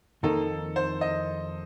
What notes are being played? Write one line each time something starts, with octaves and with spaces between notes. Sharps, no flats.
F2 D#3 A#3 D#4 A4 A#4
C5
D#5